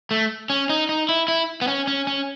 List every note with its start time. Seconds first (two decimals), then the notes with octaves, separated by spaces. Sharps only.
0.11 A3
0.50 C#4
0.70 D#4
0.89 D#4
1.09 E4
1.28 E4
1.62 B3
1.68 C#4
1.87 C#4
2.07 C#4